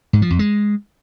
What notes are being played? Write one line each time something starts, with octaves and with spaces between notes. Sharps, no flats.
G#2
F3
F2
G#3